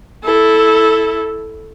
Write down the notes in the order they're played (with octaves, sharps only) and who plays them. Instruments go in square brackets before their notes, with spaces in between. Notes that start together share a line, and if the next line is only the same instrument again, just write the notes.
[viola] E4 A4